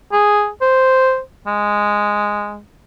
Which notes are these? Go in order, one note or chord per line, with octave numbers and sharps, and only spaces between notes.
G#4
C5
G#3